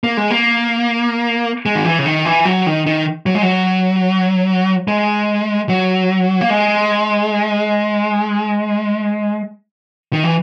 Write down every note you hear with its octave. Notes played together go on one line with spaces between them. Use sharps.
A#3
G#3
A#3
G#3
D#3
E3
C#3
D#3
E3
F#3
D#3
D#3
F#3
G#3
F#3
G#3
F#3
A#3
G#3
D#3
E3